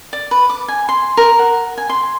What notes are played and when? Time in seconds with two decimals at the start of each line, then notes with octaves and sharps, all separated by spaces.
0.13 D5
0.31 B4
0.50 D6
0.68 G#5
0.89 C6
1.17 A#4
1.39 F#5
1.78 G#5
1.90 C6